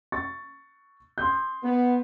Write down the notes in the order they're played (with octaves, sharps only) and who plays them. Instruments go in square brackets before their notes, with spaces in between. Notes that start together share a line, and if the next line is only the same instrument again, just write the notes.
[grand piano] C#6 A6
C6 D#6 G6
[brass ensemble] B3